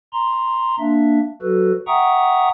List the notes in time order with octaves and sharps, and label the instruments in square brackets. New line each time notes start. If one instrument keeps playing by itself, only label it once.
[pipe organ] A#5 C6
A#3 D4 E5
F#3 F#4 A4 B4
E5 F#5 G5 A#5 C#6 D#6